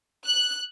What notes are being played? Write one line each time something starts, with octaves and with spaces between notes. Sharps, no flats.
F#6